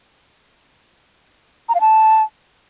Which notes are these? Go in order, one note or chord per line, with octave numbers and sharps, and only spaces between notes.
A#5
F5
A5